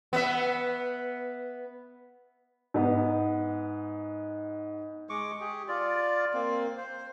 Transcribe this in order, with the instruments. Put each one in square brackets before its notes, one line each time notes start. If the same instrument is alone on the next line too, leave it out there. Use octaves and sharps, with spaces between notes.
[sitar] B3 E5
[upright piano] G#2 B3
[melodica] G#3 C#6 D6
G4 G#4
F4 D5
A#3 C4
C5